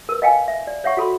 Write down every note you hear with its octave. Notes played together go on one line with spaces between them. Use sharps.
A#4 B4
D#5 F5 G5 G#5
E5
D5
C#5 E5 F#5 C#6
F#4 A4 B5 C6